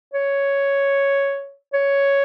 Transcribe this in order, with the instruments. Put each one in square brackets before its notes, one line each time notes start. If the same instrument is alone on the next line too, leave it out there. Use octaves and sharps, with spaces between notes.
[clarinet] C#5
C#5